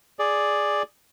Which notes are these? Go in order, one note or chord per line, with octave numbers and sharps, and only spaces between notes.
G#4 D5